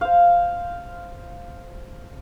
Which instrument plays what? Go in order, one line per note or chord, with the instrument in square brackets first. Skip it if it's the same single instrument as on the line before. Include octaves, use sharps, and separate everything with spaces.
[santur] C5 F5